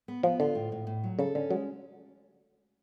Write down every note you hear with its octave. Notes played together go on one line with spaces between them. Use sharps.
B3
F3 B3
D3 F4
A2
A2
A2
F#3
C#3 A4
D3 C#4
F#3 G#3